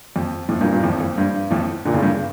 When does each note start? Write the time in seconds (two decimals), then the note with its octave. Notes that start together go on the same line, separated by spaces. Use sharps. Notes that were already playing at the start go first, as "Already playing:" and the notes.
0.16 F2
0.49 F2 A2
0.61 G2 A#2
0.72 G2 A#2
0.83 F2 A2
1.00 F2
1.18 G2
1.50 F2 A2
1.85 A#2 D3
1.94 A2 C#3
2.02 G2